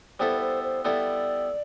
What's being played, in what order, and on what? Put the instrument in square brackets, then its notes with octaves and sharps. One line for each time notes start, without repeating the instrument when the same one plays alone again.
[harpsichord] G3 B3 E4 A4 [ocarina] C5
[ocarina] C5
C5
[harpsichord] G3 B3 E4 A4 [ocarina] D5